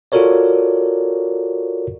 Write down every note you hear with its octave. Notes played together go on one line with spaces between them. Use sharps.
F4 F#4 A4 A#4 C#5 D5